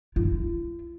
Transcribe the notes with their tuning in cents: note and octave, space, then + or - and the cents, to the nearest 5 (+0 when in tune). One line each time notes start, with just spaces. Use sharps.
F4 -45